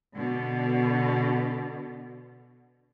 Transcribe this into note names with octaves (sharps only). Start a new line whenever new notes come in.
B2 D3